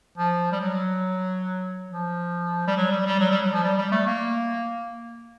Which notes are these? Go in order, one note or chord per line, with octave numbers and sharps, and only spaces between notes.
F3
G3
F#3
F3
G3
F#3
G3
G3
F#3
G3
F#3
F3
G3
G3
A3
A#3